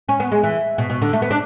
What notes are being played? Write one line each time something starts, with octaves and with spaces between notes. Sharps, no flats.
C#4
B3
G#3
E3
B2
B2
D3
A3
B3
D4